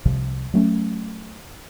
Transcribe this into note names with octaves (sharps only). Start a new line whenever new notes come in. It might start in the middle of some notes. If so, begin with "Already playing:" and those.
C2 C3 F3
F#3 A3 C#4